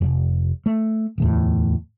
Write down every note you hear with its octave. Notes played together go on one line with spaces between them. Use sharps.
F1
A3
D1 E2 A2